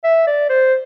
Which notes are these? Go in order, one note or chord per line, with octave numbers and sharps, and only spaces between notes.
E5
D5
C5